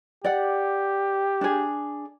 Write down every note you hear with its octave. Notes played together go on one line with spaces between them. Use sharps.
G4 D5 F#5
D4 G#4